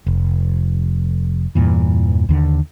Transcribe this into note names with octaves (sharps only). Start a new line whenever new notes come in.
F1
E2 G2 A#2 E3
D#2 D3